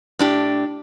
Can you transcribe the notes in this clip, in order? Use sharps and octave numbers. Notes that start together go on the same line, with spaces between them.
A2 D4 G4